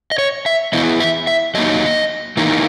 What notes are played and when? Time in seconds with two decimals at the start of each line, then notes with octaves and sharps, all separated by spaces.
0.12 D#5
0.18 C#5
0.46 E5
0.73 E3 B3 E4 D#5
1.00 E5
1.27 E5
1.55 F#3 A#3 D#4 D#5
2.37 E3 A#3 D#4